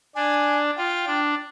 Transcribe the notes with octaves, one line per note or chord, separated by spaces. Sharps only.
D4 G#5
F4 G5
D4